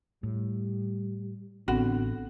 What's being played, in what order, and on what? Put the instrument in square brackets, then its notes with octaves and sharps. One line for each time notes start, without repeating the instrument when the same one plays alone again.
[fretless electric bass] A2 [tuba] G3
[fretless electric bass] A1 [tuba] D3 [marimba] B3 C4 [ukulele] F#4